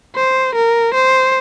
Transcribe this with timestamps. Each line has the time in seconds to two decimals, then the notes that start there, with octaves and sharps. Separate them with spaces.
0.16 C5
0.55 A#4
0.94 C5